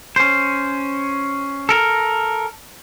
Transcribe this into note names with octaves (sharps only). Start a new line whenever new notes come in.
C#4 C5
A4 A#4